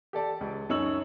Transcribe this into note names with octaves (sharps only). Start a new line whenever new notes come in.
G4 A4 D5 A5
C#2
F#2 D#4 C#5 E6 F#7